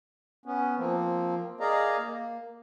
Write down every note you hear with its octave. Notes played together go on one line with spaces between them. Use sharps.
B3 C#4
F3 A#3 C4
G#4 A#4 D5 D#5 F5 A#5
A#3